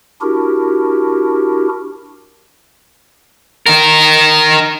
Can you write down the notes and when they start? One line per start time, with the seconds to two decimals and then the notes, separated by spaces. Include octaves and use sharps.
0.21 D4 E4 F#4 G4 A#4
3.66 D#4 A#4